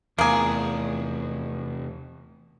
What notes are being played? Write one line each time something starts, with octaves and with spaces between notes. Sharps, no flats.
E2 C3 A3 A#3 G#4 A5